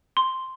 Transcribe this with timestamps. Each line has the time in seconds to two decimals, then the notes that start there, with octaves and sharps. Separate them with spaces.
0.17 C6